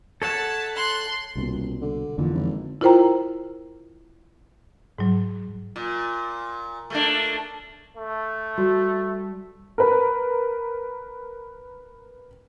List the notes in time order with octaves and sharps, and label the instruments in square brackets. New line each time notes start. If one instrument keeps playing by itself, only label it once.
[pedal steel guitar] A4 C#5 F#5 [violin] E5 A5
[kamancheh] C6 [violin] F#6
[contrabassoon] D#1 [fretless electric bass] C2 B2
[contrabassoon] D3
[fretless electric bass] F2 D3 E3 [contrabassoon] A#2
[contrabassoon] G#1
[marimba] E4 F4 A#4 C5 G5 A#5
G#2 F#3
[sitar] A#2
A3 A#3 D4
[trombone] A3
[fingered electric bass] G3 [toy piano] F#4
[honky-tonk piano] A#4 B4